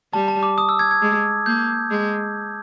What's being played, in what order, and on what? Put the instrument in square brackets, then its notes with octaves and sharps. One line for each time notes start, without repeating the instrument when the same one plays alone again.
[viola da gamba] G3 [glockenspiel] A5
[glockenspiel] A5
D6
D#6
E6
G#6
G#6
[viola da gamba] G#3
[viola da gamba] A#3 [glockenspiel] G6
[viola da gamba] G#3